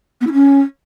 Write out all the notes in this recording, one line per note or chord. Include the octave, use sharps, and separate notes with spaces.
B3
E4
C#4